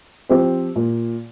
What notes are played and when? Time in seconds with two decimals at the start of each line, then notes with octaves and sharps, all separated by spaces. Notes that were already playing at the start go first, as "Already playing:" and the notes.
0.29 F3 C4 G4 C5
0.76 A#2